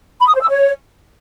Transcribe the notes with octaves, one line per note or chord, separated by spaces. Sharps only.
B5
D#6
C5
E6
C#5